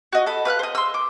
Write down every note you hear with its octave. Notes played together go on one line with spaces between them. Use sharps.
F#4 D#5
A4 B5
B4 F5 F6 F#6
C5 D#5
C6 E6
D6